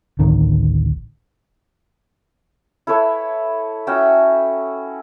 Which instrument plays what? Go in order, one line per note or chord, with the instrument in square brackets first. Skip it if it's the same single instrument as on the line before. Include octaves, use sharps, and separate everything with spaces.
[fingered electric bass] D1 A1 D#3
[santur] E4 A4 B4 C#5
C#4 F#4 E5 G5